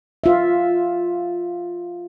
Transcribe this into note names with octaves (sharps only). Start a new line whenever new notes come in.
F4 E5